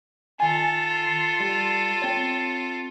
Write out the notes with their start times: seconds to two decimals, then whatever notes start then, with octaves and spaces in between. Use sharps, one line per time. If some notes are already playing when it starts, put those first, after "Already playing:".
0.40 D#3 F4 A4 G#5
1.40 G3
2.02 C4 C#5